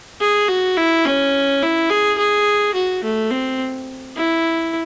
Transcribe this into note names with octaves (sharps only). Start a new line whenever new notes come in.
G#4
F#4
E4
C#4
E4
G#4
G#4
F#4
A3
C4
E4